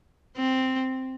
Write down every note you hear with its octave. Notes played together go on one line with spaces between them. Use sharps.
C4